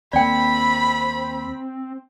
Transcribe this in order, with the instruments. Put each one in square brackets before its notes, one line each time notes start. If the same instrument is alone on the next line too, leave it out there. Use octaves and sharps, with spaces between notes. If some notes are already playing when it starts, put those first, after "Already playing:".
[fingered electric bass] D#2 A#3 [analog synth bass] C4 [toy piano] D5 G5 [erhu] B5